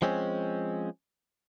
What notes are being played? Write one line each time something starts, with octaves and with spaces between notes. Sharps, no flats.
F3 G#3 C4 C#4